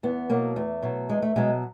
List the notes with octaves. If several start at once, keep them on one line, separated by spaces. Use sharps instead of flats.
E2 B3
B2 F#3 A#3
E2 A3
B2 F#3
E2 G#3
A3
B2 F#3 G#3